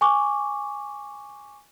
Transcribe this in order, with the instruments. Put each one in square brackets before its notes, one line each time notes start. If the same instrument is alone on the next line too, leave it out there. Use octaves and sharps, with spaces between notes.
[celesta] G#5 C#6 D6